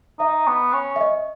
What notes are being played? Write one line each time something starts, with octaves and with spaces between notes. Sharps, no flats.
D#4 E5
B3
C#4
E5
D#5